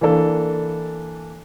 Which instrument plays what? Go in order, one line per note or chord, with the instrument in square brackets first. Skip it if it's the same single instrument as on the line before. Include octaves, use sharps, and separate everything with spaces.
[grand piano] E3 A#3 D4 A4